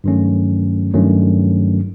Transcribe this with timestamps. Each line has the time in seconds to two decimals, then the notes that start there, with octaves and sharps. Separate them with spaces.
0.04 G2 D#3 F#3 A3 C#4
0.94 G2 D#3 F#3 A3 C#4